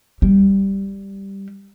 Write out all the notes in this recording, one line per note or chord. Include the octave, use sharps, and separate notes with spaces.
G3